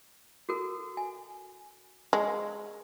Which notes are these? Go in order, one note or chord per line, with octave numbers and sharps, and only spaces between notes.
F#4 A4 A#4
G#5
G#3